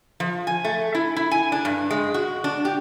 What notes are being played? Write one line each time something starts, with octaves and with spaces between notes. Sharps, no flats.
F3
G#5
A3
E4
E4
G#5
D4
G2
G#3
F#4
D4
G4